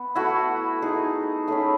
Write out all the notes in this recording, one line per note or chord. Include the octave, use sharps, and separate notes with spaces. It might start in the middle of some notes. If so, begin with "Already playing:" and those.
Already playing: B3
A3 E4 F#4
A3 D#4 G#4
A3 C#4 E4 G#4